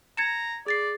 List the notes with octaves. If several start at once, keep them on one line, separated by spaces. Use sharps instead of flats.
A#5 G#6 C#7 E7
G#4 D5 A6 C7